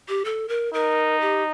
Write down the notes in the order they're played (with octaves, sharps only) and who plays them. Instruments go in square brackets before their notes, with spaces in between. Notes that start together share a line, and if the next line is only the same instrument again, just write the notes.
[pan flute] G4
A4
A#4
[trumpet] D#4 [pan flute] A#4
[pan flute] G4